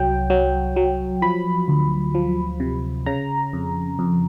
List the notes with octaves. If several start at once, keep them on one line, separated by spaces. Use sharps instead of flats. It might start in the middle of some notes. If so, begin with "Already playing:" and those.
Already playing: C2 F#3 G5
F#3
F#3
F3 B5
D2
F3
C3
C#3 A#5
F2
F2